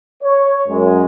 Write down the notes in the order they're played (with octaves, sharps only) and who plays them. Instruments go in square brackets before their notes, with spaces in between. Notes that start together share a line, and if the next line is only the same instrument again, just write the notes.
[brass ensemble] C#5
F#2 G#3